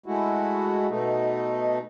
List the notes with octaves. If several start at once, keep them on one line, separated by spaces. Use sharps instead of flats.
G#3 A3 E4 F#4
B2 A3 D#4